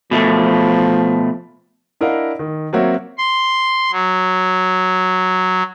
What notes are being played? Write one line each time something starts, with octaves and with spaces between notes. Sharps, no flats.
B2 F3 A3
D4 E4 A#4 D#5 F5 F#5
D#3
F#3 A#3 C4 F#4 C#5 E5
C6
F#3